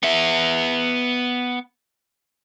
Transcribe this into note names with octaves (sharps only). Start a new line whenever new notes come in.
B3 E5